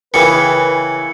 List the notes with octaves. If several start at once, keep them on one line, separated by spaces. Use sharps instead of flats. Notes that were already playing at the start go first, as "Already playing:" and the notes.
C#3 E3 A#4 B4 G5 D6 C#7